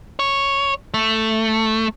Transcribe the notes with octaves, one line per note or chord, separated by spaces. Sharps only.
C#5
A3